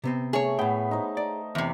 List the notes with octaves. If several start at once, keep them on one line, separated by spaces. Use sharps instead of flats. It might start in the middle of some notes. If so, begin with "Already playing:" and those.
C3 B3 C4
A3 G#4 C#5
A2 B3 G5 B5
D#4 C5
D5
E2 C3